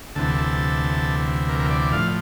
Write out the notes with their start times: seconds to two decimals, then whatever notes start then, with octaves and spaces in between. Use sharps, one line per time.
0.15 D2 C3 E3 A4
0.38 A4
1.49 A#4
1.59 A#4
1.70 D5
1.81 D5
1.92 A2 F3 F5